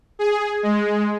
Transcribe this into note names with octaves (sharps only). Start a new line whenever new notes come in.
G#4
G#3